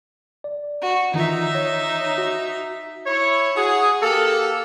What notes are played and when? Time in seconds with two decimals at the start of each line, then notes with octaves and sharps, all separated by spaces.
0.44 D5
0.82 F#4
1.14 D#3 E3 D#4 F4 E5
1.55 C#5
2.18 F#4
3.06 E4 C#5
3.56 F#4 G#4
4.02 A#3 G4 A4